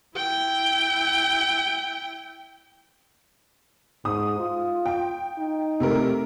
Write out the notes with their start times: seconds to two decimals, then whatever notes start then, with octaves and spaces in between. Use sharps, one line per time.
0.16 E4 G5
4.05 G#2 D#6
4.40 F4
4.86 G5
5.38 D#4
5.80 C3 A3 A#4